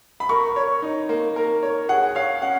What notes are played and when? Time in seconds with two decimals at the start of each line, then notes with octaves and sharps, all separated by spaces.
0.20 B5
0.29 A#4 C#6
0.56 C#5
0.82 D#4
1.09 A#3
1.36 A#4
1.63 C#5
1.89 G#4 F#5
2.15 C#5 F5
2.41 C#4 F#5